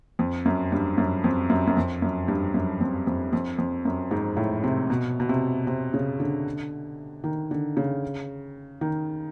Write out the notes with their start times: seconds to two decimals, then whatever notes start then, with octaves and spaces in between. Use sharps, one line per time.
0.19 F2
0.45 F#2
0.72 G2
0.98 F#2
1.24 F2
1.50 F#2
1.67 F#2
1.77 F2
2.02 F#2
2.28 G2
2.54 F#2
2.81 F2
3.07 F2
3.33 F2
3.58 F2
3.85 F#2
4.11 G#2
4.37 A2
4.64 C3
4.90 B2
5.20 B2
5.29 C3
5.67 C3
5.94 C#3
6.20 D3
7.24 D#3
7.51 D3
7.77 C#3
8.81 D#3